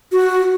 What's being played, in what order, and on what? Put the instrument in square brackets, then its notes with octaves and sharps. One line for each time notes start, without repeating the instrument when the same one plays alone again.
[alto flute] F#4